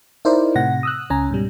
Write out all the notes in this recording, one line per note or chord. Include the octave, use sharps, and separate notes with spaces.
D#4 E4 A#4 C5 D5
A2 C3 F#5 A#6
D#6 E6 F#6
C#2 C#4 G#5 A#5
G#2 B2 G3